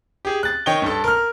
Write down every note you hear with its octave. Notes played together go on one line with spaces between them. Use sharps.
G4 G#4
F#6 A6
D#3 C#5 D#5 G5 G7
G2 A4
A#4 F6